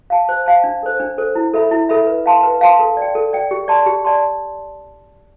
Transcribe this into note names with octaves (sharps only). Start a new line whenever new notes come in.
F5 A5
C5
F5 A5
D4
A4 C5
D4
A4 C5
E4
A4 E5 B5
E4
A4 E5 B5
B4
F5 A5 C6
B4
F5 A5 C6
A4
D5 G5
A4
D5 G5
G4
D5 A5 C6
G4
D5 A5 C6